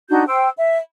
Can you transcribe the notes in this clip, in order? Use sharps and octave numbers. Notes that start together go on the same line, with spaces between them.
D4 D#4 F#4 G6
C5 G5 E6
E5